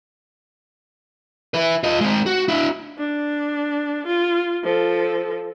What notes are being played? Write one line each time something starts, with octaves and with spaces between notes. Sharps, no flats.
E4 B4
F4 D#5
G#3 C4
F#4
D4 E4
D4
F4
F3 A4